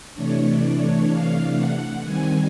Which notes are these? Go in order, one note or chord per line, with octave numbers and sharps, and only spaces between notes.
C3 E3 A3 D4 C#5
D5
C#5
F5
F#5
D#3 G3 C4 G#5